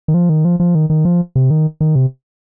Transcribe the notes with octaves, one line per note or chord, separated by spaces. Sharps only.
D#3
F3
D#3
F3
F3
D#3
D#3
F3
C3
D#3
D#3
C3